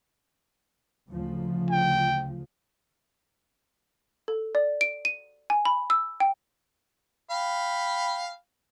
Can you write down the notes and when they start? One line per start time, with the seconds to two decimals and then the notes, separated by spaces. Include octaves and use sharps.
1.10 D2 C#3 F3
1.71 G5
4.28 A4
4.55 D5
4.81 D7
5.05 D#7
5.50 G#5
5.65 B5
5.90 E6
6.20 G5
7.30 F5 G5 B5